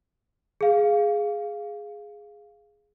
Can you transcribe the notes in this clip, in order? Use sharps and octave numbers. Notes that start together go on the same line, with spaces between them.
G#4 F5